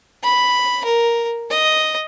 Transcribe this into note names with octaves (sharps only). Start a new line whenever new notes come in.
B5
A#4
D#5